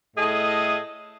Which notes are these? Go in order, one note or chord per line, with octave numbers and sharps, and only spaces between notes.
A2 A3 G#4 A4 D#5